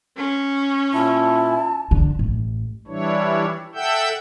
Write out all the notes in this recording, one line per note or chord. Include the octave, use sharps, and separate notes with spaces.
C#4
A#2 E4 A5
D3
A1
E3 G3 D4 E4 C#5
A4 E5 F#5 G5 E6 G6